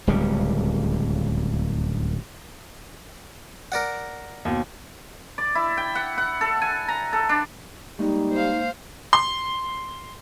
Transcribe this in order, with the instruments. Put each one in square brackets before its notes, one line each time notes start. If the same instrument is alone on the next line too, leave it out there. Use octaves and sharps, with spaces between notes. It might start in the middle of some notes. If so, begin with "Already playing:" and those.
[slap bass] D1 C#2 C#3 G3
[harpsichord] A#4 D5 F#5
[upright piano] D#2 B2
[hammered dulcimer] D5
E4
G5
F#5
F#5
A4
G#5
A#5
A4
D4
[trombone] G3 [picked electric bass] G#3 A#3 [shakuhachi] D#4
[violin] C5 F5
[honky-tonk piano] C6